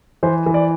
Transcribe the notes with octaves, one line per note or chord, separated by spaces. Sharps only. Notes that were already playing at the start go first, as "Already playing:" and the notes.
E3 C5
E3
D5